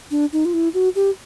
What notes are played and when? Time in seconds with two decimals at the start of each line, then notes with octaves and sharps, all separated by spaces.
0.11 D4
0.33 D#4
0.45 F4
0.54 E4
0.74 F#4
0.95 G4